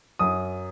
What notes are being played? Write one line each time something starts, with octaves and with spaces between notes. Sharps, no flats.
F#2 D#6